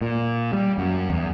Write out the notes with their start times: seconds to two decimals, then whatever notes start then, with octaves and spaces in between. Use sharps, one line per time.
0.01 A#2
0.53 G3
0.78 F#2
1.10 E2